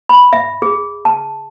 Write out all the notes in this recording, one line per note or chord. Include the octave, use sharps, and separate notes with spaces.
B5
E5
G#4
A5